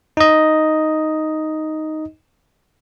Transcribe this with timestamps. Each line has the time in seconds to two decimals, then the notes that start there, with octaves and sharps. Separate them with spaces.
0.17 D#4 D#5